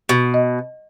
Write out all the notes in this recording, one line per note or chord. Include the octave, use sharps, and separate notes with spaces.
B2
D#5